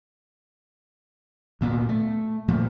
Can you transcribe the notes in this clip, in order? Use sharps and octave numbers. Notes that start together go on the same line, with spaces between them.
D2 A#2 B3
A3
A#2 F3 A3